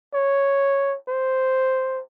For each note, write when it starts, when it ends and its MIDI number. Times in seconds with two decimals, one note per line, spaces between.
0.14 0.97 73
1.08 2.01 72